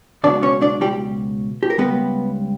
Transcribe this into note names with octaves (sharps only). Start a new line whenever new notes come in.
C#2 B2 F#3 D4 D5
C#4 C#5
D4 D5
G3 G4
G4
A#4
C#2 B2 G3 B3 B4